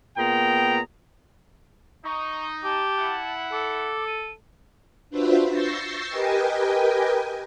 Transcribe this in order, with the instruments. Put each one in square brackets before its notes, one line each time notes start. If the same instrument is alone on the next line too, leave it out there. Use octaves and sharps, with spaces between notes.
[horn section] A#2 B3 G#4 G5 A#5
[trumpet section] D#4 [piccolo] C#6
[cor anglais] G4 [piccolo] A5
[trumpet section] E4 F#5
[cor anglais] A4 [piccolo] D6
[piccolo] D#7
[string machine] D4 F4 F#4 B4 C5 E5
C#6 E6 G6 A6 A#6 C7
G4 A#4 B4 D#5 G5 G#5